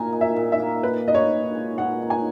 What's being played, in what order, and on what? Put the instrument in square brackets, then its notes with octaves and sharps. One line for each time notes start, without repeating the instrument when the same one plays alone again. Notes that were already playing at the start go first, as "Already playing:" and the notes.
Already playing: [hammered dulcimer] A#2 A#3 [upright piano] G#5 A#5
[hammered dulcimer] D#4
[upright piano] E5
[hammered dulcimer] A#2
[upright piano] E5
[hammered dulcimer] A#3
[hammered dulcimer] A#2 [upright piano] B4
[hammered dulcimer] D#4 [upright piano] D#5
[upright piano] C#5
[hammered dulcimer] A#2
G#3
[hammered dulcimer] A#2 [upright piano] F#5
[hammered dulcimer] D#4
[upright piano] G#5